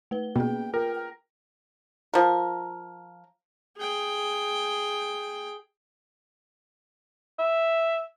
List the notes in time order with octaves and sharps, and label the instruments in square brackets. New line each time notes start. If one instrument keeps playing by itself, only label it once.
[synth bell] A3 B4 G7
[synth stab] B2 [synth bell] A#3 C#4 G#4 [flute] G5
[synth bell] F4 [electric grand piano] A#4 [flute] G5
[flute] G5
[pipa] F3 A#4
[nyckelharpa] G#4 G5
[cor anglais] E5